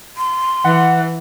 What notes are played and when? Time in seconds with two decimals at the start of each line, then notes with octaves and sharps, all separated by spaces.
0.17 C6
0.64 E3 F#5